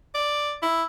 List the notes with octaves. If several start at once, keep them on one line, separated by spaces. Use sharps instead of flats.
D5
E4